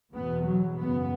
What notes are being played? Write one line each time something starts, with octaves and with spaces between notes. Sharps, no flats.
E2 B2 B3
F#3
F#2 C#3 B3